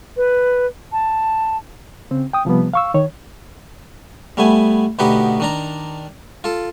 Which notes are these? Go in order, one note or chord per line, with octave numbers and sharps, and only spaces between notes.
B4
A5
C#3 C4
G5 D#6
C3 F3 G3 B3
F5 C#6 E6
D#3 C#5
G3 A3 B3 G#5
D2 B2 B3 D#4 G4 F#5
D#3 D4 A#5
F4 A4